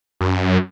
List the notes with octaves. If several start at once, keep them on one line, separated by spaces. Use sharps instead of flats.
F#2